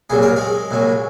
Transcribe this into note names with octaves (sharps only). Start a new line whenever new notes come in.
C2 A#2 F#3 G#4
A#4
G#3 G#4
C2 A#2 F#3